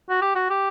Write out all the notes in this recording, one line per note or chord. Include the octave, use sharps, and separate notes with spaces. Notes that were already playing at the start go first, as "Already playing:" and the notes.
F#4
G4
F#4
G4